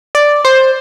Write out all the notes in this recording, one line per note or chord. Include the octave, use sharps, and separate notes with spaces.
D5
C5